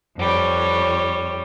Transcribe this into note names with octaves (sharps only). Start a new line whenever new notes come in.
F2 G3 C#5